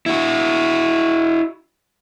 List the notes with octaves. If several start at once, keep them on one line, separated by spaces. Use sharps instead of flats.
E4 F#4